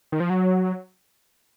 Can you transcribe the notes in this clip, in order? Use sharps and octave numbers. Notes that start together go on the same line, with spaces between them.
D#3
F3
F#3